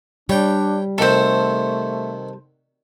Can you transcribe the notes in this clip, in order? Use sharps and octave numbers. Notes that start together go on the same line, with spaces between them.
G3 D4 C#5 G5
C3 D#3 A3 F#4 A4 C5